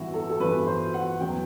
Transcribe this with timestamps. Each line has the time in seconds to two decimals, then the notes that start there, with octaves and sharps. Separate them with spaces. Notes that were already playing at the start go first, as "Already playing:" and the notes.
Already playing: G2 E3 B3 E4 F#4
0.14 A4
0.30 A4
0.40 G2 E3 B3 B4
0.67 C5
0.94 F#5
1.20 E2 B2 F#3 B3 G5